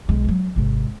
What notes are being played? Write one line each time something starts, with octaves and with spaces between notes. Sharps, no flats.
B1 G#3
E3 F#3
G#1 C3